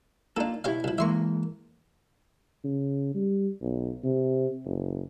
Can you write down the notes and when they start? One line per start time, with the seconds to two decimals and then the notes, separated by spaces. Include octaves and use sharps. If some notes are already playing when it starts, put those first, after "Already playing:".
0.37 A#3 D4 D#4 F4 A4
0.64 B2 E4 G4 C#5 F5
0.84 C2 F3
0.98 E3 G#3 A#3 E5 C6 C#6
2.64 C#3
3.14 G3
3.62 B1
4.03 C3
4.65 F#1